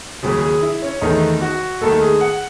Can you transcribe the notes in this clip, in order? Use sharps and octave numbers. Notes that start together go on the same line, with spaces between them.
D#2 C#3 F#3 G#4
G#4
E4
C#4
E2 D#3 A3 D#4
F#4
D#2 D#3 A3 A4
G#4
F#5